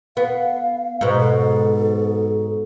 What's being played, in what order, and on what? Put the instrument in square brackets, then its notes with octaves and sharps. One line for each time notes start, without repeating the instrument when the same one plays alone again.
[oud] B3 [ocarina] F5
[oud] G#2 B2
[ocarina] A4